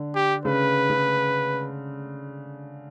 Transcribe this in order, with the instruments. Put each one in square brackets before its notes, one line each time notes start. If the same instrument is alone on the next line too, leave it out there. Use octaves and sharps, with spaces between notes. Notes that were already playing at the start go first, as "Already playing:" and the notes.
Already playing: [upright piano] D3
[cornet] G4
[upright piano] C#3 [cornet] B4
[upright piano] C#3